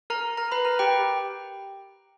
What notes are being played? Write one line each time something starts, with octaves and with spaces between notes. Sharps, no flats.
A#4 A#5
A#4 A#5
B4 B5
A#4 A#5
G4 G5